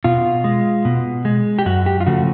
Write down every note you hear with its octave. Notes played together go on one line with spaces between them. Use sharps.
B2 F4
G#3
B2
G#3
G4
F#2 F#4
G4
F4
C#3 F3 A3 F#4